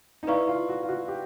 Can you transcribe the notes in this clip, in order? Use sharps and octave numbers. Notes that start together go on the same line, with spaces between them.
D#4
E4 B4 D5 F5 A#5 C#6
F4
F#4
F4
F#4
G4